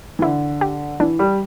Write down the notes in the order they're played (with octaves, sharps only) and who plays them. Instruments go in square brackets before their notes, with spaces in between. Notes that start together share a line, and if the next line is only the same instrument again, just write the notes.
[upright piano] E3
[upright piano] D3 [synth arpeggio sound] E4
[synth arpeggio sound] G4
[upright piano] E3 [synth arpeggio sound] D4
[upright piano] G3